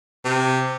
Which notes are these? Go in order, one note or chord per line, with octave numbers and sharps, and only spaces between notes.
C3